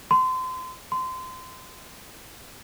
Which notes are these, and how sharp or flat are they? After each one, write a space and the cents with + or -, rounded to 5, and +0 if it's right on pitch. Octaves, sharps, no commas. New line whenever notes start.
C6 -30
C6 -25